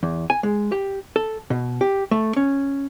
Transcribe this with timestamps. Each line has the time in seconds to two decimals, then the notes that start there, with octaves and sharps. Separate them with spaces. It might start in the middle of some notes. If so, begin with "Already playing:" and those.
0.03 E2
0.30 G#5
0.43 G#3
0.72 G4
1.16 A4
1.50 B2
1.81 G4
2.11 A3
2.36 C#4